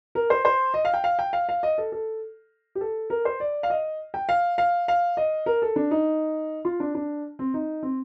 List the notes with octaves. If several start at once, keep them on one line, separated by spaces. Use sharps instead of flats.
A#4
C5
C5
D#5
F5
G5
F5
G5
F5
F5
D#5
A4
A4
G4
A4
A#4
C5
D5
F5
D#5
G5
F5
F5
F5
D#5
A#4
A4
D4
D#4
F4
D4
D4
C4
D#4
C4